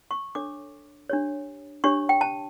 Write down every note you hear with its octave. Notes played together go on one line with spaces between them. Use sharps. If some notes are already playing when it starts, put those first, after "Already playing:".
C#6
D4 A4 C#5 D6
D4 G4 C#5
D4 G4 C#5 C#6
G5
A5